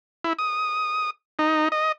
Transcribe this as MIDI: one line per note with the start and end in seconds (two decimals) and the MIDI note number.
0.24 0.33 64
0.39 1.10 87
1.39 1.68 63
1.72 1.92 75